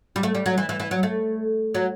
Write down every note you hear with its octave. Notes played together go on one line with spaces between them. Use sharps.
G3
A3
G3
F#3
E3
E3
E3
F#3
A3
F#3